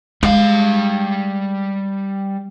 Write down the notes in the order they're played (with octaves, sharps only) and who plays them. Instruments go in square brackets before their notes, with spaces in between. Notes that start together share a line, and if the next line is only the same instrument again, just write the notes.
[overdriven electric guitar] G3 F5 [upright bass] G#3